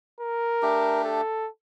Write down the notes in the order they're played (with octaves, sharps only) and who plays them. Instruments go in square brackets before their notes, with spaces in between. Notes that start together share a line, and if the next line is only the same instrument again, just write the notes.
[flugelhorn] A#4
[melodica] A3 D4 G4
[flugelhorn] A4